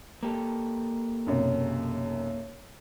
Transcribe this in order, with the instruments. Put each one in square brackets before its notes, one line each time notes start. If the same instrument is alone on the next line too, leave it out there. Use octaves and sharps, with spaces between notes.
[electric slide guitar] A#3 G4 A4
[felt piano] B1 F#2 C3